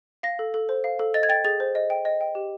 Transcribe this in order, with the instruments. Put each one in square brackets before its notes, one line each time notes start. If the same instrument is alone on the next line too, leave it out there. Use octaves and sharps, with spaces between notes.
[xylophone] F5 A#6
A4
A4
C5
F5
A4
D#5 A6
G#6
G5 A6
G#4 A6
C5
D#5
G5
D#5
G5
G4